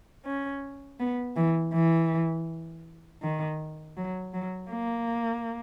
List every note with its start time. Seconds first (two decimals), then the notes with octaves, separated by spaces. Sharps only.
0.25 C#4
0.99 B3
1.36 E3
1.73 E3
3.22 D#3
3.97 F#3
4.33 F#3
4.71 A#3